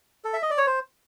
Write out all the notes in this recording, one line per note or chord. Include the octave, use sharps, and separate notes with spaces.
A4
E5
D#5
D5
C#5
C5